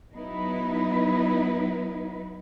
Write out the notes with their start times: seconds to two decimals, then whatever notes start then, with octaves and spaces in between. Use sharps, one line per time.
0.14 F#3 B3 D#4 E4 B4